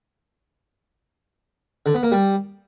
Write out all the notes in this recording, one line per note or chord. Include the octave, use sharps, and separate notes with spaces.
D3
B3
A#3
G3